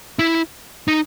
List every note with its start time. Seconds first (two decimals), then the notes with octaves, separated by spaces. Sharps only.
0.19 E4
0.88 D#4